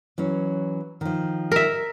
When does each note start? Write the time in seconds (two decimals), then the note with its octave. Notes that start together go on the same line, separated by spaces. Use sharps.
0.18 E3 F#3 C#4
1.01 D#3 F3
1.52 A#4 E5